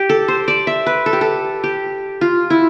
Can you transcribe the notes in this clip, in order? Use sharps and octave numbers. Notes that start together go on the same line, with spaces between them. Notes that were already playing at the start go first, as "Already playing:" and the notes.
Already playing: G4
A4
C5
D5
E5
B4
A4
G4
A4
G4
F4
E4